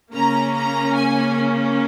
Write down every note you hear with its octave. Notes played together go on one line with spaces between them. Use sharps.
C#3 A#3 C#4 A#5
A#5
G#5